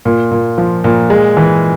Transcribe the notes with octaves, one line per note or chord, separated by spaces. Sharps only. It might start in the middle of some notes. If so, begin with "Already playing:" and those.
A#2
A#2
F3
A#2
G#3
E3